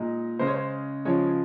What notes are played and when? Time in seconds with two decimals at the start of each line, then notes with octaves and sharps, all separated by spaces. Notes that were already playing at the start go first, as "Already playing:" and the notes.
Already playing: A#2 G#3 D#4
0.39 C#3 G#3 C#4 C5
0.47 C#5
0.55 C5
1.05 C#3 F3 G#3 C#5